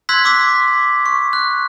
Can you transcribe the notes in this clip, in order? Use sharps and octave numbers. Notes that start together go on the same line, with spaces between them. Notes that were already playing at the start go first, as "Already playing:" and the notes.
C6 E6 F#6 G#6 B6
D6 E6 B6
C#6
F#6